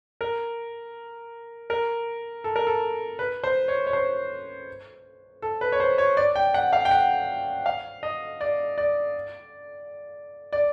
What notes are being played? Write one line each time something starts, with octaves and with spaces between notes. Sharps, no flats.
A#4
A#4
A4
A#4
A4
B4
C5
C#5
C#5
C5
A4
B4
C#5
C5
C#5
D5
G5
F#5
F5
G5
F#5
F5
D#5
D5
D5
D5